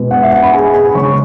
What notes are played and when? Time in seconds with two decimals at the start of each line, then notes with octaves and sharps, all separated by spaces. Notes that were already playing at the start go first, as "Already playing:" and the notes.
Already playing: B2 G#3 B3
0.11 F#5
0.23 E5
0.32 F#5
0.42 B5
0.53 G#4 G#5
0.74 G#4 G#5
0.89 B5
0.94 C#3 G#3 C#4 C#5 C#6